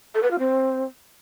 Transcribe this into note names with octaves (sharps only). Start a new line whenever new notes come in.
A4
B4
F4
C4